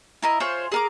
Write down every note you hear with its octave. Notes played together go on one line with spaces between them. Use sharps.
E4 A#4 D#5
F4 G#4 C5 C#5
G#4 A#4 D6